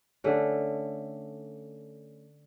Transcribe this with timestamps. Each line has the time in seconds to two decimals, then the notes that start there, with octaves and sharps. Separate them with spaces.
0.24 D3 A3 C#4